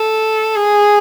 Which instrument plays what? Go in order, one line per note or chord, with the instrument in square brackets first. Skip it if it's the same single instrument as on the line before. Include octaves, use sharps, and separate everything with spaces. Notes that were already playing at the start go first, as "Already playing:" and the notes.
Already playing: [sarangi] A4
G#4